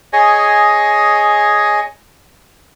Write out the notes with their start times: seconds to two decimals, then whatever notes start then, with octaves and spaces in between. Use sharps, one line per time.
0.13 G#4 C#5 D#5 G#5